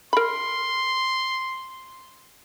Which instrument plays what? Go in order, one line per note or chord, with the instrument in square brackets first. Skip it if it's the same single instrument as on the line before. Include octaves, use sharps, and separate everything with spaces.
[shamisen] A#4 B5 [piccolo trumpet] C6